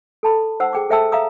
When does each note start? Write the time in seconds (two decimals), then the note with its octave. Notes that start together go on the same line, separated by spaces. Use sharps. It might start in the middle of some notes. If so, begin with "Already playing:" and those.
0.23 A4 A5 B5
0.60 D#4 C5 F#5 E6
0.73 G#4 G5 D6
0.89 A4 C5 E5 G5 A5 E6
1.12 E5 F5 A#5 D#6 E6